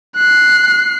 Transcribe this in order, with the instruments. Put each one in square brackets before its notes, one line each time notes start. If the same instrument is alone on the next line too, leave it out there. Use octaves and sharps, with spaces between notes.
[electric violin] F#6 C7